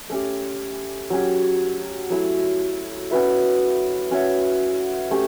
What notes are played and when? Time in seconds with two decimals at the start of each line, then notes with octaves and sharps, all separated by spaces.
0.10 A3 C#4 G4
1.10 F#3 C#4 G4
2.10 F#3 A3 E4
3.11 C#4 F#4 B4 E5
4.11 C#4 F#4 C#5 E5
5.11 A3 C#4 G4